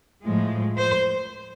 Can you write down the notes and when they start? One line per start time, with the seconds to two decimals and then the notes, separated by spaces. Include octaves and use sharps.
0.24 A2 F3 G#3
0.78 C5